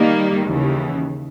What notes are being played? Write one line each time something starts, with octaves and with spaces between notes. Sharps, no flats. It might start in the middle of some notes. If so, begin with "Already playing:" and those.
Already playing: D#3 G3 A#3 D#4
D#2 C#3 E3